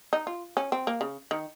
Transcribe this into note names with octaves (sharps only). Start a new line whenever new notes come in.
D#4
F4
C#4
C4
A#3
C#3
D#3